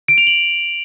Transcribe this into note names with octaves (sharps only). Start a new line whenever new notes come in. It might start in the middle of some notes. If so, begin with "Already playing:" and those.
D7
F7
F#7